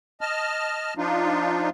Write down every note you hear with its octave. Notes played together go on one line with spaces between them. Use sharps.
D#5 A5 F6
F3 D4 D#4 F4